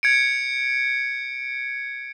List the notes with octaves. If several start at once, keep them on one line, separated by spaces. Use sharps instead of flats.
G#6 C#7 D7